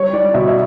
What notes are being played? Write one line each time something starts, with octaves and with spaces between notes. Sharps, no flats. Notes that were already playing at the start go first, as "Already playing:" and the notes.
Already playing: G3 C#5
G3 D5
B2 E5
E5